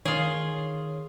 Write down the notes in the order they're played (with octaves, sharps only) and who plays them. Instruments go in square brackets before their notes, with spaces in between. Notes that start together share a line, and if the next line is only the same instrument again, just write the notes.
[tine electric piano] D#3 [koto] F4 G#4 [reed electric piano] C#5